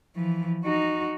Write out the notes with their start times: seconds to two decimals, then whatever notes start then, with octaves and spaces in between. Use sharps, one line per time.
0.16 E3 F3
0.64 D#4 F#4